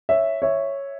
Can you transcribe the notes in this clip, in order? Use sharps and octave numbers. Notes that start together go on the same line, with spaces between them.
C#5 E5
C#5 E5